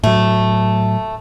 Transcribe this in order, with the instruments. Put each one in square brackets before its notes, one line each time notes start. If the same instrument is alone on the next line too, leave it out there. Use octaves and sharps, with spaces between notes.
[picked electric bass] A2 F#3 [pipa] A3